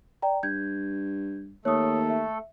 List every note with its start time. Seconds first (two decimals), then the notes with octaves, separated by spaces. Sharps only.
0.22 D5 G5 A#5
0.43 G2 G6 G#6
1.65 D#2 A3 A4 C#5 D#6
2.10 E5